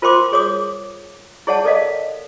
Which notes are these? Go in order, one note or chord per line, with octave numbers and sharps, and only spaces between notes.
F4 A#4 C5 G5 C6 D6
G#4 C#5 D6 D#6
E4 G#4 C#5 D5 F#5 A5
A4 A#4 D5 D#5 F5